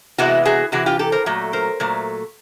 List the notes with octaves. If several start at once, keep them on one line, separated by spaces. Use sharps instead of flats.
C3 E3 G#3 B3 E4 F#4
F#4 G#4
C3 E3 F#4 G#4
F4 G4
G4 A4
A#4 C5
A#2 F#3 A3
A#4 C5
A#2 F#3 A3